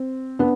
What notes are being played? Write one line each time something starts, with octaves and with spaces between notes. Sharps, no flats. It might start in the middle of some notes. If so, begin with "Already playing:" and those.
Already playing: C4
B3 D4